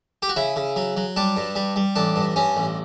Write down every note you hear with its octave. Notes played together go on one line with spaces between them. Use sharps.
G4
F#4
C#3 E4
C#3
F#3
F#3
G3 D4
G2
G3
G3
A1 D4
G2
G2 C#4
A1